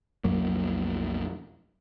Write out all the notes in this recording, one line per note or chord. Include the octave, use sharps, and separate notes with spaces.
B1 F2 F#3 A#3